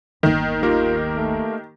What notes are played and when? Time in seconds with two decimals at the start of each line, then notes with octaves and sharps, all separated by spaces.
0.23 G1 D#2 D#3
0.63 A#3 F4 G4 A#4
1.16 A3